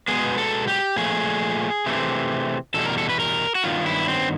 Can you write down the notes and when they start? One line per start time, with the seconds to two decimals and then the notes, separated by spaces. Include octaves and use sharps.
0.08 B2 G#3 B3 G#4
0.38 A4
0.68 G4
0.96 A#2 F3 A3 G#4
1.86 C3 E3 A3 C4
2.74 E2 B2 G3 A4
2.86 A#4
2.98 A4
3.09 B4
3.20 A#4
3.55 F#4
3.64 G2 D#3 F#3 B3 F4
3.86 E4
4.08 C4